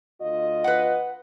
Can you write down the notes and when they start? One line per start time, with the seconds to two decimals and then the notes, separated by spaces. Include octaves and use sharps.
0.20 D2 F4 D#5
0.64 B4 F#5